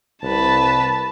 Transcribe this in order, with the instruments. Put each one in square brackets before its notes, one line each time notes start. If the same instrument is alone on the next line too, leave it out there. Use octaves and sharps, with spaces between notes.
[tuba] C2 [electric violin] B4 A5